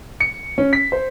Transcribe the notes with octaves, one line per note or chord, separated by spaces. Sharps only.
C#7
C#4
B6
C5